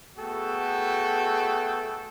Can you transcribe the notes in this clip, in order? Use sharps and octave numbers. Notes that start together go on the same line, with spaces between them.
A3 B3 F#4 G#4 A4 G5